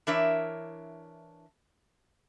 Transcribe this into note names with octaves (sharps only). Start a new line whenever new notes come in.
E3 D4 A#4 C#5 E5